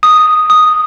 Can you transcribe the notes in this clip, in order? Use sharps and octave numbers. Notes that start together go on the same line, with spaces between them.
D#6
D#6